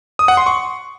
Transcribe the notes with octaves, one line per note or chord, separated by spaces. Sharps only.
D#6
F#5
C6
C#6